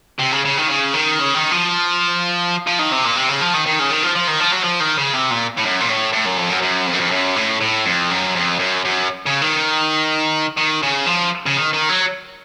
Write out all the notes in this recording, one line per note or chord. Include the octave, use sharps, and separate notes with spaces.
C3
C#3
C#3
D#3
C#3
D#3
C#3
D#3
F3
F3
D#3
C3
A#2
C3
C#3
F3
D#3
D#3
C#3
D#3
F3
F3
D#3
F3
F#3
F3
D#3
C#3
C3
A#2
A2
F#2
A#2
A2
A2
F#2
F2
F#2
F#2
F2
F#2
F2
F#2
A2
A2
F2
F#2
F2
F#2
F#2
C#3
D#3
D#3
C#3
F3
C#3
D#3
D#3
F#3